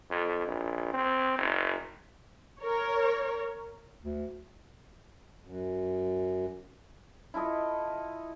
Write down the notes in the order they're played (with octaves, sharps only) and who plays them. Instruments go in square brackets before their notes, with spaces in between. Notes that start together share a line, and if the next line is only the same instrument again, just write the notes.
[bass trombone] F2
A#1
C4
F#1
[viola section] A#4 C#5
[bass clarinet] D2
[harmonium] F#2
[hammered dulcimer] E4 F4 A4 D#5